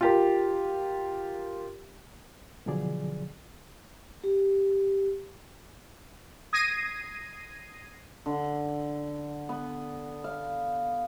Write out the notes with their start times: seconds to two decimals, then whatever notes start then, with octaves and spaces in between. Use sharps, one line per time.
0.01 F4 G4 A#4
2.66 B2 D3 F3 F#3 G#4 D5
4.24 G4
6.53 D#6 G#6 A#6 C7 D#7
8.26 D3
9.49 B3
10.24 F5